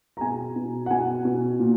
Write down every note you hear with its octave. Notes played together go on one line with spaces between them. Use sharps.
A#5
B2 G#5
B2
F#5
B2 G#5
B2
A#2